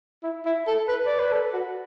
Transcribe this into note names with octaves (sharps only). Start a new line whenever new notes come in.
E4
E4
A4
B4
D5
B4
A4
F#4